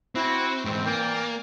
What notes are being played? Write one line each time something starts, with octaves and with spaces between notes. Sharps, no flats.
C4 E4 F#4
G#2 E3 C4
E3 A#3 D5 G5